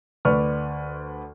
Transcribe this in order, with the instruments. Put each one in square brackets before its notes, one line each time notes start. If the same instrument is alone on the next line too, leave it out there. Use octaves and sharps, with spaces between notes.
[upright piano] D2 B4 D5 C#6 F6